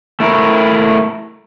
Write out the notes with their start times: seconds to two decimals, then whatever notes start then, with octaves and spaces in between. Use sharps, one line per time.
0.20 A3 E4 A#4